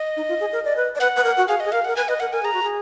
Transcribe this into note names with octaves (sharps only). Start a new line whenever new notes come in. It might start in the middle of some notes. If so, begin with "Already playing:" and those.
Already playing: D#5
D#4
F4
G#4
A#4
D5
B4
D5
B4 F#5
B4
A#4
F#4
G#4 F5
G#4 D#5
A#4 F5
A#4 F#5
B4 G#5
B4 D#5
A#4 F#5
A#4 G#5
G#4 A#5
F#4
G#4